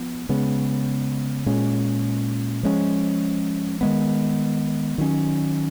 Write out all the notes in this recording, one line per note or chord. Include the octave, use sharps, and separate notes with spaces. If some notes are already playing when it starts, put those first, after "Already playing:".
Already playing: F3 B3
C#3 G#3 B3
A#2 G#3 C#4
F3 G#3 C#4
D#3 G#3 B3
D#3 F#3 C#4